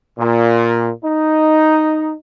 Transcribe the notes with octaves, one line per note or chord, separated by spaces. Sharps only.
A#2
D#4